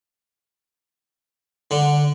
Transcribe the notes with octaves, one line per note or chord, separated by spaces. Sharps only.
D3